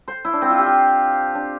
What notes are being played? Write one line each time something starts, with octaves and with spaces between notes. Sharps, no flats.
C5
E4
D4
C4
F4
G4
F4
D4